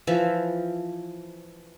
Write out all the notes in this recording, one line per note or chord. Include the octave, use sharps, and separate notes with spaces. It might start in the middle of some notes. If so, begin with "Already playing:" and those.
E3 F3 E5